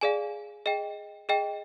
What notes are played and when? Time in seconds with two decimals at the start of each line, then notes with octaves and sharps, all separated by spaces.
0.01 G#4 D5 F5 G#5
0.66 G#4 D#5 G5
1.29 G#4 D#5 G5